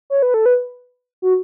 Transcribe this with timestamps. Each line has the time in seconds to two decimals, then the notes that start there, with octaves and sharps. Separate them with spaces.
0.10 C#5
0.22 B4
0.34 A4
0.46 B4
1.22 F#4